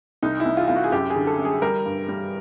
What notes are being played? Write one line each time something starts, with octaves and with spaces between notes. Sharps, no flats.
C2 D#4
E4
C2
F4
C2 F4
F#4
G#4
F#2 G4
G#4
D3
A4
F#2
G#4
G3 A#4
G2
G3